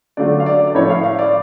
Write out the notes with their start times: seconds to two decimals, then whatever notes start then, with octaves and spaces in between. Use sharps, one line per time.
0.17 D3 F#3 A3 F4 D5
0.40 F5
0.46 D5
0.67 D5
0.75 A2 F3 A3 C#5
0.90 F5
1.04 F5
1.19 D5